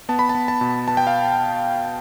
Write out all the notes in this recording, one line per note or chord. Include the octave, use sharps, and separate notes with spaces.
B3 A5
B5
A5
B3
A5
B2
B3 A5
G5
F5